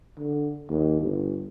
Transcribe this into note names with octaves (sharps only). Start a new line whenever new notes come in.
D3
D#2
G1